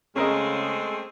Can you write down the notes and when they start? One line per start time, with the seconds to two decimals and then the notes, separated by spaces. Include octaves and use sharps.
0.16 C#3 G#3 A3 C4 C#4 G#4 A#4 D#5